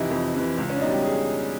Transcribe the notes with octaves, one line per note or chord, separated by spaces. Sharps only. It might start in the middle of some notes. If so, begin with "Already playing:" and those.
Already playing: F2 C3 E3 D#4 E4
F2
C3 E3
C#2
C#4
D4
B2 G3 D#4
G4
G#4